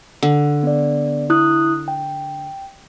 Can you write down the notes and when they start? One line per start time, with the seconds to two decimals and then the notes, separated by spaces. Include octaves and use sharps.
0.23 D3
0.63 B3 D5
1.30 E4 D#6 F#6
1.88 G5